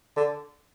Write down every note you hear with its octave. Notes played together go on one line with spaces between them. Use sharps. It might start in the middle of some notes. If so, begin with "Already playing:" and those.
D3